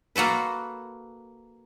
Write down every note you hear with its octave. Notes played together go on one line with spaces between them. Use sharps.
A#3 F#4 A4 B4